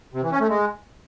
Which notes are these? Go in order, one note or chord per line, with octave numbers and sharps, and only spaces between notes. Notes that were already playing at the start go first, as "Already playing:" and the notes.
C3
E3
C#4
A3
G#3